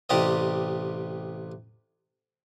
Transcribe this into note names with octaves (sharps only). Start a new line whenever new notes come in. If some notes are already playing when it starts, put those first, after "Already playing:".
A1 C3 G4 D5 D#5